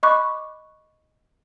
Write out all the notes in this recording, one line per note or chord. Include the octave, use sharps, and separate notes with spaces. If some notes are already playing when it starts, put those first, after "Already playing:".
D#5 B5 C#6 D6 F#6